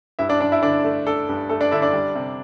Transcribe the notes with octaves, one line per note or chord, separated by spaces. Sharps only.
G2 E4 E5
D4 D5
G2 D4 D5
E4 E5
D3 D4 D5
A3
D4 A4
G2
A3 A4
D4 D5
D3 E4 E5
D4 D5
G3
C3